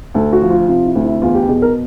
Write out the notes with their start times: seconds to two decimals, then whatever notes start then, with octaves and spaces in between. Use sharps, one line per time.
0.14 D2 A4
0.33 F#4
0.42 F3
0.50 F4
0.68 C3 F4
0.86 E4
0.95 D2
1.04 E4
1.22 E2 F4
1.35 G4
1.48 B2 G#4
1.62 A#4